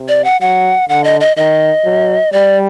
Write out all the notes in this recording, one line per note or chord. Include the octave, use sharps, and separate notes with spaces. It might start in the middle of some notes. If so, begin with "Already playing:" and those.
Already playing: C3
D5
F#5
F#3 F#5
D3 F#5
D#5
D#5
D#3 D#5
F#3
G3 D5